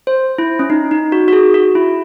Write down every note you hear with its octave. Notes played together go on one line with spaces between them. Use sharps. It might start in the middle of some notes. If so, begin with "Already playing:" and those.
C5
E4
C#4
D#4
D#4
F#4
F#4
G#4
F#4
E4